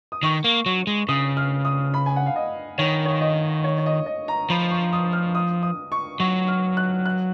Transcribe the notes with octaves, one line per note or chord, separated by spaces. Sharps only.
D#6
D#3 C#6
A#3
F#3 C#6
G#3
C#3 D#6
F6
D#6
B5
G#5
F#5
F5
D#5
D#3 C#5
C#5
D#5
C#5
C#5
D#5
D#5
A#5
F3 B5
C#6
D#6
F6
D#6
D#6
C#6
F#3 C#6
F6
F#6
F#6